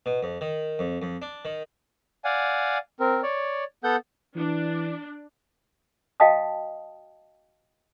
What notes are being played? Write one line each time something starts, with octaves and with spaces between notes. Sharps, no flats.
B2
F2
D#3
F2
F2
D4
D#3
D5 F5 F#5 G#5
C4 A#4
C#5 D5
B3 A4 F#5 G6
E3 D4
F#4 D#5 F5 G5 A5 D#6